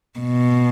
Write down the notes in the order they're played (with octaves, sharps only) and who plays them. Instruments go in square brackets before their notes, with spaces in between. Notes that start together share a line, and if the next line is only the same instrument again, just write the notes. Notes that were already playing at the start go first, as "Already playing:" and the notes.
[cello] B2